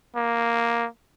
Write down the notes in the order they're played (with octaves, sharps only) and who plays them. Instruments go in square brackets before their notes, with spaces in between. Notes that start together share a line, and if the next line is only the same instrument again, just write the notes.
[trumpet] A#3